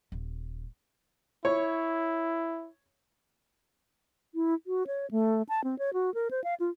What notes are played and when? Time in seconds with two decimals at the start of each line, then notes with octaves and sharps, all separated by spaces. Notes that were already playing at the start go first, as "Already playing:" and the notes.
0.12 D#1
1.45 E4 C#5
4.35 E4
4.67 F#4
4.87 C#5
5.11 A3
5.49 A5
5.64 C4
5.79 C#5
5.93 F#4
6.14 A#4
6.31 C5
6.44 F5
6.60 F4